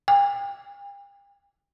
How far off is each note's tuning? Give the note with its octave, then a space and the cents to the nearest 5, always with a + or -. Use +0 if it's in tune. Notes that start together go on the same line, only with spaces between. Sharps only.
G5 +40